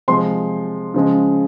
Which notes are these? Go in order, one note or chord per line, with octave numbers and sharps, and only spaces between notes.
C3 F3 G#3 C6
C#3 F3 G#3